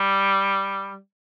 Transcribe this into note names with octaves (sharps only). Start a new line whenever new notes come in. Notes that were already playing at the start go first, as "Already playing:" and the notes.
Already playing: G3